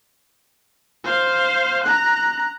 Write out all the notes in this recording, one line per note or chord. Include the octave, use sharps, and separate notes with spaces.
C5 F5
A#5 F#6